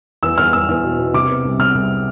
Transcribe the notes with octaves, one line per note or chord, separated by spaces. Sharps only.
E2 E6
E2 F6
B3 E6
E2
B2
B2
C3 D6
B3
C2
C3 F6
C2